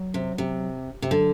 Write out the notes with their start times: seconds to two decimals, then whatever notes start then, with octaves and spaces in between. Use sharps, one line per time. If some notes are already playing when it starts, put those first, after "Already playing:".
Already playing: F#3
0.14 C3
0.38 C3
1.02 C3
1.11 D3 F#3